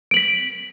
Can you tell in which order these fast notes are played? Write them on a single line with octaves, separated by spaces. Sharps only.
D7 F#7 B6